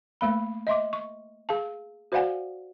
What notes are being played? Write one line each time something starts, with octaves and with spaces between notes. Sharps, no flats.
A3 A#3 B5
D#5 E5 C6 D6
C#6
G#4 F5 A5
F#4 C5 D5 F5 F#5 G#5